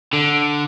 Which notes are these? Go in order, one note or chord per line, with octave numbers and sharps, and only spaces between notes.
D3